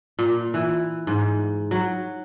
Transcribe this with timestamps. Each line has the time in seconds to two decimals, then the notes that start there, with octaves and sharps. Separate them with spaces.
0.19 A#2
0.54 E3
1.07 G#2
1.71 F#3